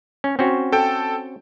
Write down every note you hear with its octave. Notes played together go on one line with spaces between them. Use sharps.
C#4
C4 C#4 F#4
A4 G5